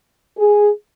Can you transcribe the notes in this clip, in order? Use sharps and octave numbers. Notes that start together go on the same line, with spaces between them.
G#4